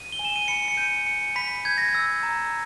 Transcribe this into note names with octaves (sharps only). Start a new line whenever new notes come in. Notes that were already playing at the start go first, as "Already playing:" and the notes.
Already playing: D#7
G7
G#5
E7
D#7
B5 C#7
C#7
G6 D#7
G6 C#7
B5 B6
G6 G#6
A#6
G#6
E6
A#5